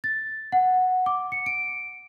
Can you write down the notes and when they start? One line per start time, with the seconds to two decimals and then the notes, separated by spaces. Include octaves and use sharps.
0.04 A6
0.52 F#5
1.06 D6
1.32 C#7
1.46 D7